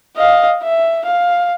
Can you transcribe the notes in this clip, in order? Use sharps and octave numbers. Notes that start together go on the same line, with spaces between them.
D#5 F5
E5
F5